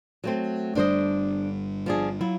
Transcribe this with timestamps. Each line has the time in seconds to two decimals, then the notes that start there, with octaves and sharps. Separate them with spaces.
0.24 F#3 A3 C4
0.75 G1 D3 G3 D4 C5 D#5
1.86 F3 D4 G#4
2.21 F#3 E4 F4